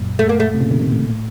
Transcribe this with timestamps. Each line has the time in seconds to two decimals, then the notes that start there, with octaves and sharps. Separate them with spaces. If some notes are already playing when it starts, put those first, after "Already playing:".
Already playing: F#2 A#2
0.19 A3
0.29 A#3
0.40 A3
0.54 C3
0.60 A#2 C#3
0.71 C3 D#3
0.81 C3 D#3
0.92 A2 C3
1.02 A#2
1.10 A2